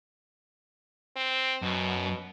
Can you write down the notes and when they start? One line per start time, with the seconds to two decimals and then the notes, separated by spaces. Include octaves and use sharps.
1.16 C4
1.62 F#2 B2